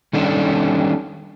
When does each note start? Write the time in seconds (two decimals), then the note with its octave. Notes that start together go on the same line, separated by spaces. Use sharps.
0.13 D#3 G3 C#4 D4 A4